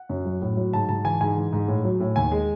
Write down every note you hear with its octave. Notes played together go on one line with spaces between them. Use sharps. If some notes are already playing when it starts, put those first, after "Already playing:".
Already playing: F#5
F#2
F#3
A2
F#3
G#2 A5
G#2 A5
E3 G#5
G#2 G#5
E3
G#2
A2
F#3
A2
D#2 G#5
G#3